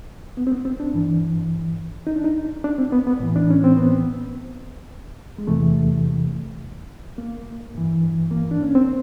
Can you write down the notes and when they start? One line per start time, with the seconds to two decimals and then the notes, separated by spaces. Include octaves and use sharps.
0.37 B3
0.47 C4
0.51 B3
0.65 C4
0.80 D4
0.94 G2 E3
2.07 D#4
2.16 D4
2.24 D#4
2.64 D4
2.78 C4
2.92 B3
3.07 B3
3.20 A2 E3
3.36 D4
3.50 C#4
3.64 C4
3.77 B3
5.38 G#3
5.47 E2 C3 E3 A3
7.18 A#3
7.75 G2 E3
8.31 A#3
8.51 D4
8.63 C#4
8.75 C4